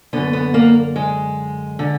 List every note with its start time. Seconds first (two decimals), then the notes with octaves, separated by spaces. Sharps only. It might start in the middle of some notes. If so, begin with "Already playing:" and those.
0.13 F#2 D3 B3
0.33 B3
0.54 A#3
0.96 G#3
1.79 D3